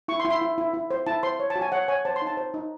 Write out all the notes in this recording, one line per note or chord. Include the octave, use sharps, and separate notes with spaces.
E4 C#6
C6
E4
C6
E4
E4
E4
C5
E4 A5
C5 C6
C#5
A5
F#4
G#5
C#5 F#5
C#5 G#5
C5 A5
C6
D#4
A5
C5
D#4